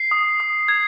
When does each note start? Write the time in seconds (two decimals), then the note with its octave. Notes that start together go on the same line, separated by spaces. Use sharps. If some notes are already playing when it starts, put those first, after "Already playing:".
Already playing: C7
0.11 D#6
0.40 D#6
0.68 G#6